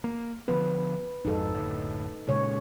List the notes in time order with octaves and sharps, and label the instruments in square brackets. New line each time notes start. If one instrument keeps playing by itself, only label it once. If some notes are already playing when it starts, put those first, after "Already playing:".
[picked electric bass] A#3
[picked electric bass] D3 F3 B3 [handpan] B4
[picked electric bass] G#1 F2 G#2 [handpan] D#4 A4
[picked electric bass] F#1 D2 A2
[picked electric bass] A#2 G#3 [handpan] C#3 C#5